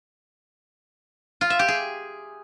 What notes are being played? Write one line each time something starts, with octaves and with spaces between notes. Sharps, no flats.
F4
E5
G4
G#4